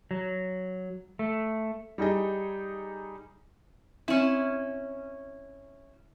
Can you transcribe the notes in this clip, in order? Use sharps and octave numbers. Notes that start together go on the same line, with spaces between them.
F#3
A3
G3 D#4 G#4 D#5
C4 C#4 E4